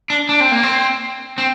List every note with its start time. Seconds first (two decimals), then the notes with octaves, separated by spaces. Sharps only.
0.10 D4
0.29 D4
0.40 C4
0.51 A#3
0.63 C4
1.38 C4